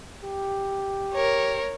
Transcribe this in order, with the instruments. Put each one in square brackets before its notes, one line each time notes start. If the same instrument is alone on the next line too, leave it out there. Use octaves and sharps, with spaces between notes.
[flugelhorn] G4
[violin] A#4 C#5